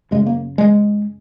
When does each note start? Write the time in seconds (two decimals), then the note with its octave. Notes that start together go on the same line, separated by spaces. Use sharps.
0.11 F#2 C#3 G#3
0.26 A#3
0.58 G#3